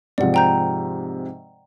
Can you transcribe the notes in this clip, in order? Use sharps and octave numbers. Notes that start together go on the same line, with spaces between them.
G#2 C3 F3 D5 F#5
G5 A#5 G6